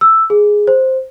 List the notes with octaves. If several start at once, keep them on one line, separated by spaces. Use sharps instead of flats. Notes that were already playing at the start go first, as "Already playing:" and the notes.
E6
G#4
C5